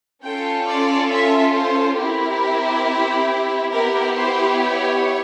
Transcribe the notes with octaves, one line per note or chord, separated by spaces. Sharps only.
C#4 F4 A4 G5
D5
E5
C5
C4 E4 G4 A#4
B3 E4 G4 A#4
C5
C#5